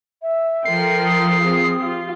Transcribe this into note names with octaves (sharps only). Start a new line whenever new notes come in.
E5
F3 A4 A#4 G5 C7
D#6
C4 F4 G#4
F4 G4